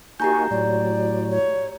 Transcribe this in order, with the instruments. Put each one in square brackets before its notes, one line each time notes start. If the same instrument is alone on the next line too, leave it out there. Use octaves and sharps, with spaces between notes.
[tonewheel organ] A#3 D#4 F#4 [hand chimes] G4 A#5 G6 [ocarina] G#5
[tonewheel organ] A2 F#3 [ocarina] D5
[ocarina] C#5